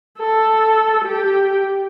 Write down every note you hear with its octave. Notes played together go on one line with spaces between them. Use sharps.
A4
G4